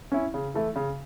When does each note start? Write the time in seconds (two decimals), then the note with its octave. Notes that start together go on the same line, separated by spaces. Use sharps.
0.12 C#4 E4
0.34 C#3
0.54 E3 A3 E4
0.76 C#3